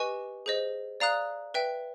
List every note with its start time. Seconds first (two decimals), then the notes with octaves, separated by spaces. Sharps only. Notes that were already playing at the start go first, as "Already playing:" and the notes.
Already playing: G4 B4 D#5 G#5 C#6
0.46 G#4 C5 D#5
1.00 D5 F5 A#5 D#6 F#6
1.54 B4 E5 G5